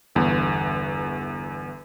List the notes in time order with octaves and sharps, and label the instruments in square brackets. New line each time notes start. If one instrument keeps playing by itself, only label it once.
[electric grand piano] G1 E2